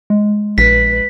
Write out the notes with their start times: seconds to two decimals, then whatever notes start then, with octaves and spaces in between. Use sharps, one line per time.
0.10 G#3
0.58 A#1 B4 B6